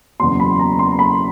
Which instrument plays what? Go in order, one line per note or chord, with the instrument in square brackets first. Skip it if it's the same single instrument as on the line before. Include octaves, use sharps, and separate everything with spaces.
[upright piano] F#1 E2 B2 C6
B5
A#5
C6
A#5
B5